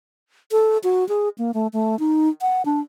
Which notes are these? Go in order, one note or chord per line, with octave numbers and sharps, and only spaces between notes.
A4
F#4
G#4
A#3
A3
A3
D#4
F#5
D4